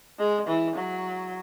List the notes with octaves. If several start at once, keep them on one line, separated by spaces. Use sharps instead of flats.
G#3
E3
F#3